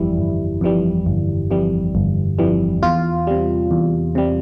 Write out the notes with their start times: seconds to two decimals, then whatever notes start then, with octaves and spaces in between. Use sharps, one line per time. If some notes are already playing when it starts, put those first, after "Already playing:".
Already playing: G1 F2 E3 G3 E4
0.18 G1
0.61 F2 E3 G3
1.06 G1
1.51 F2 E3 G3
1.95 G1
2.39 F2 E3 G3
2.83 E2 F4
3.27 C3 G3
3.71 E2
4.15 C3 G3